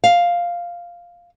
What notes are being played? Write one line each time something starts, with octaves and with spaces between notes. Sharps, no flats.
F5